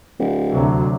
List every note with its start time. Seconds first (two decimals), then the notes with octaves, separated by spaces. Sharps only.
0.19 D1
0.52 D2 C3 F#3